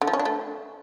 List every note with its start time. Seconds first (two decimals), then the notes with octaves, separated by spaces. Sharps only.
0.01 D3
0.07 F3
0.13 C#4
0.19 D4
0.25 A3